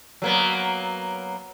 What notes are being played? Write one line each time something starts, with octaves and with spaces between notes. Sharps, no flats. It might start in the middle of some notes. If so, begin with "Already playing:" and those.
F#3 A#3 B3